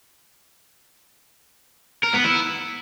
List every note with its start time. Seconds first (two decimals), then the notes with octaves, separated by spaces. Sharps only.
2.04 A#4
2.14 B3
2.24 E4